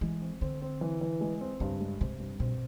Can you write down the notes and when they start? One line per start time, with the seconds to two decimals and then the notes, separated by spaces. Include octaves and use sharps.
0.01 E3 G#3
0.21 C4
0.41 D3 C4
0.62 C4
0.81 E3
1.01 E3
1.21 G#3
1.41 C4
1.60 G2 C#3
1.80 G#3
2.00 C3 C4
2.20 G2
2.40 B2 C4